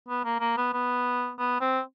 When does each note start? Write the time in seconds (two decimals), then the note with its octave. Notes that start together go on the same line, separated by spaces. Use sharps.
0.08 B3
0.25 A#3
0.40 A#3
0.57 B3
0.73 B3
1.39 B3
1.60 C4